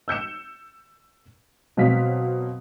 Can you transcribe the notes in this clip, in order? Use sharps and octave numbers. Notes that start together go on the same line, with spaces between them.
E6 G6 C#7 E7
B2 F#3 C4 F5 B6